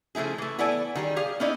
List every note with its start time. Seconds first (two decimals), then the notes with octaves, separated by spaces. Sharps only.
0.15 C#3 F3 A3 E4 G#4
0.38 E3 A3
0.59 B3 E4 A4 D5 G#5
0.95 D#3 G3 G#4
1.16 G4 G#4 F5
1.40 B3 C#4 D#4 E4 D5 D#5